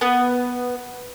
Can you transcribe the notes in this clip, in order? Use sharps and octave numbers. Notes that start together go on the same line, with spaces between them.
B3